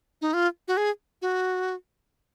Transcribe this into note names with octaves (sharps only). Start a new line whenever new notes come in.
D#4
F4
F#4
G#4
F#4